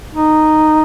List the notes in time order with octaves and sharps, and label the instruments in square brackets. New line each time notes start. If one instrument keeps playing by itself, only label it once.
[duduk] D#4